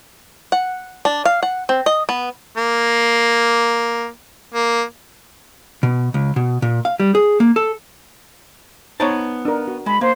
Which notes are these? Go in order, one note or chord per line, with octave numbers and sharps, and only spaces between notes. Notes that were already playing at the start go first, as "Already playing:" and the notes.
F#5
D4
F5
F#5
C4
D#5
B3
A#3
A#3
B2
C#2
B2
A#2
F5
G3
G#4
A#3
A4
B3 D#4 C5 C#5 A5
D4 A#4
F#4
G#3 B5
A#3 C5